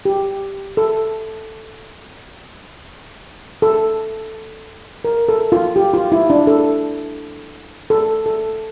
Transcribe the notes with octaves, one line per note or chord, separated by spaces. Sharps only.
G4
A4
A4
A#4
A4
F4
G4
F4
E4
D4
A4
A4
A4